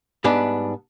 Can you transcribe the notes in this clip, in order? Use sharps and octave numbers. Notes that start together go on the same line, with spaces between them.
G#2 G3 B3 D4